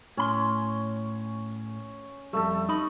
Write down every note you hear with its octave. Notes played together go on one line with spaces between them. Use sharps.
A2 C#4 B5 C6
F2 G#2 G3 A3 A4
D#4 D#5 B5